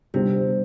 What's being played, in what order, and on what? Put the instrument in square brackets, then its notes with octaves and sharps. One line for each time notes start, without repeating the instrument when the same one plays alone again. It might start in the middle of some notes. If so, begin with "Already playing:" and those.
[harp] C3 [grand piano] G3 B3 D4 G4 C5